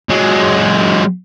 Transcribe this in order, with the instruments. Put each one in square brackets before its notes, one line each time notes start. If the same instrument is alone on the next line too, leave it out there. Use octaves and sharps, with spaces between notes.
[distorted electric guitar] F#3 G#3